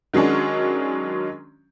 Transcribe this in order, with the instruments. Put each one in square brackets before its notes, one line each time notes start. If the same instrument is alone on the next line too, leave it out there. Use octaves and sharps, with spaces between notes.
[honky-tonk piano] D#3 F#3 G#3 C#4 D4